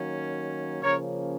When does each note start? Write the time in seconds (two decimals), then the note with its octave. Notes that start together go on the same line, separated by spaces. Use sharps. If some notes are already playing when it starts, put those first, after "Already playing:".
Already playing: D#3 F#3 A#3 C#4
0.82 C#3 F3 A#3 C#4 A#4 C#5